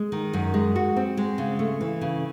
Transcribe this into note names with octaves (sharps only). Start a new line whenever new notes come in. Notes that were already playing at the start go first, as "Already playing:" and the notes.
Already playing: G#3
D#3
F#2
G#3
F#4
C4
G#3
C#3
A3
E3
C#3